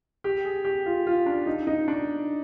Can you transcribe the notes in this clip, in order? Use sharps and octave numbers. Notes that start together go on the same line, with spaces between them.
G4
G#4
G4
F4
F4
D4
D#4
D#4
D4